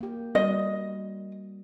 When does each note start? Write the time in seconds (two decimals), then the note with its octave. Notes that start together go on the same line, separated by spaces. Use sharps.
0.01 A#3 G4
0.35 G3 F#4 D#5